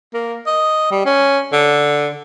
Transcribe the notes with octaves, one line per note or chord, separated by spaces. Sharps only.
A#3
D#5
G3
C#4
D3